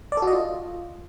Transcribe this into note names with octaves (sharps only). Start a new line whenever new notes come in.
D5
A4
F#4
D#5
F4